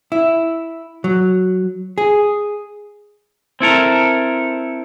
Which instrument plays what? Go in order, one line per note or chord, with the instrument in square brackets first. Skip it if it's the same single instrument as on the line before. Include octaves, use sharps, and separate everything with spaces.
[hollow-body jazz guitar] E4
F#3
G#4
[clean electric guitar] C4 E4 A4 A#4